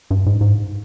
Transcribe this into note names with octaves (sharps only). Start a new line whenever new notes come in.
G2
G#2
G#2